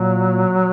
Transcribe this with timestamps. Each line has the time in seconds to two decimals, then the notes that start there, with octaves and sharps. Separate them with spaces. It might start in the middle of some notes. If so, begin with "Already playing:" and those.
Already playing: A#2 F#3